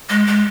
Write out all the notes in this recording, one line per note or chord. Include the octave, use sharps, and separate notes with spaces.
G#3
G#3